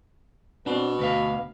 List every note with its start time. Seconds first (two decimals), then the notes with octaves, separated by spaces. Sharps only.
0.66 B2 C4 D4
0.99 D2 B4 F5